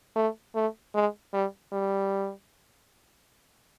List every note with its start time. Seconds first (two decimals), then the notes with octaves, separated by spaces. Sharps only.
0.16 A3
0.55 A3
0.95 G#3
1.34 G3
1.73 G3